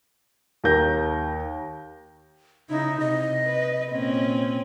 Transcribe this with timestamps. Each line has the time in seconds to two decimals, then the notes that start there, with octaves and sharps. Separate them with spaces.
0.64 D#2 D#3 A#4 G6 A#6
2.70 C#3 D#4 E4
3.00 C3 D#5
3.45 B4
3.91 A#2 C4 C#4